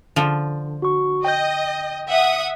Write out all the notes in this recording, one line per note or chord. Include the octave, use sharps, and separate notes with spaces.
D3 F3
F#4 C#6
D#5 G5 G6
E5 F#5 D#6